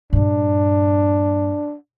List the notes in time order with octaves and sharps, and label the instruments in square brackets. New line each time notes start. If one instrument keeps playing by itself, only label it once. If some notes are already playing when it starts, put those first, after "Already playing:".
[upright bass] G2 A#2 [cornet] D4